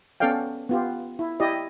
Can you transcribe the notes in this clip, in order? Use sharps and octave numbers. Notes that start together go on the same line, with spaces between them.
B3 C#4 A4 D5 F5 G5
B3 F4 G4
E4
E4 G4 D5 D#5